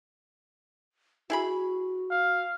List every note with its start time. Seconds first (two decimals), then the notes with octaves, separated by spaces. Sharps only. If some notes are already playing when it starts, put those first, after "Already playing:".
1.30 E4 F#4 G#4 B5
2.11 F5